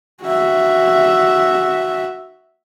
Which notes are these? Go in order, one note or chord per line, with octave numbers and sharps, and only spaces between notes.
F#4 E5